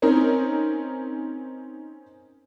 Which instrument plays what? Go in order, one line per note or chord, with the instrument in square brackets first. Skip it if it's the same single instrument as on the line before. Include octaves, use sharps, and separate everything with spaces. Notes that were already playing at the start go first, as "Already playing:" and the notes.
[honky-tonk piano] C4 C#4 D#4 A#4